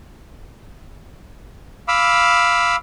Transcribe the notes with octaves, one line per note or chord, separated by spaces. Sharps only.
F5 B5 D6 E6